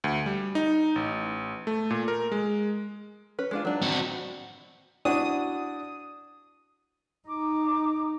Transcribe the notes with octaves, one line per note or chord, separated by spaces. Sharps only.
D2
G3
D#4
A1
A3
A#2
A#4
G#3
C#4 B4
G#3 D4 F4
F#3 D4 D#4
C4 F#4
D4 E4 F#4 D#6
D#4 D6